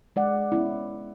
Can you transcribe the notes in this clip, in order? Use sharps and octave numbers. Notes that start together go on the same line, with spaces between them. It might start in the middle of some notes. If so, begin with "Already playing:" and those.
G#3 D5 F#5
B3 C#4 E4